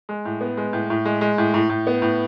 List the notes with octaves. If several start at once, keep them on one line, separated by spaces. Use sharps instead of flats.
G#3
A2
B3
G#3
A2
A2
G#3
G#3
A2
A2
A2
B3
A2